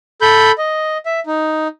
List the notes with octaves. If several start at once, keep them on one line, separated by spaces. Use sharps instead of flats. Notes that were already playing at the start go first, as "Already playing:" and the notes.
A4 B5 G6
D#5
E5
D#4